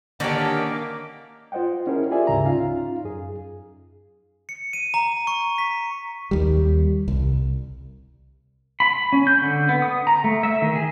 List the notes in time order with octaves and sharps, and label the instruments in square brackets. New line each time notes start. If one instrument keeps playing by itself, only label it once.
[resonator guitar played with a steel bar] D3 G4 [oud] D#3 C#4 D4 [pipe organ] A#3 D6
[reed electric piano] F4 C5 D#5 F#5 G5
C#4 E4 G#4 A#4
F4 G4 G#4 D5 E5 G#5
D2 G#2 C#3 E5 A#5
C#4 D#4 F4 F5
F#2 G#4
[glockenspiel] C#7
D#7
A#5
C#6
B6
[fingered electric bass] D#2 G3
C2
[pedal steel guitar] B5
C#4
G6
D3
B3
D#6
A#5
A3
E5
D#3
G#4